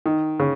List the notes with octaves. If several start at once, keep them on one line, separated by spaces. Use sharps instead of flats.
D#3
C#3